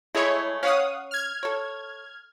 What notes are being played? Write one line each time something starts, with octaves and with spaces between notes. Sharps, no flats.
G#3 A3 E4 G#4 C#5
C#4 C#5 F5 F#5 D#6
F6 G#6
A4 C#5